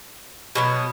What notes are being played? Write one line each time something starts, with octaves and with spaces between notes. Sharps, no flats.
B2 F#3 B3